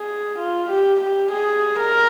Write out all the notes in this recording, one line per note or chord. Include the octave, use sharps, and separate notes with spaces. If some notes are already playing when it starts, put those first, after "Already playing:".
Already playing: G#4
F4
G4
G4
G#4
A#4